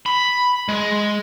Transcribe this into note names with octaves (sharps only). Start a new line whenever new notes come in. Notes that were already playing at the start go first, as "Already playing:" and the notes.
B5
G#3